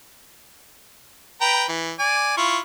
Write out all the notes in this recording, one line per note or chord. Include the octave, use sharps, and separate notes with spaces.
B4 G5 A#5
E3
D5 G#5
E4 F4 C#6